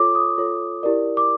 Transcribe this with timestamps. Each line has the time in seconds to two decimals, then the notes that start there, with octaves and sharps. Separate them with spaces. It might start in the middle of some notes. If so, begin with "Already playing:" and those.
Already playing: F4 A4 C#5 D6
0.15 D#6
0.38 F4 A4 C#5
0.83 E4 G4 A#4 D5
1.17 D6